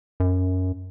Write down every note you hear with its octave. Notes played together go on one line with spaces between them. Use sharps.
F#2